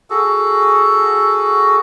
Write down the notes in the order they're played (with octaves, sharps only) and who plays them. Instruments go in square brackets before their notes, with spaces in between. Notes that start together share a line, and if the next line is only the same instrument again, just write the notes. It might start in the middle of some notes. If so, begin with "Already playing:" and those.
[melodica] F#4 G#4 A4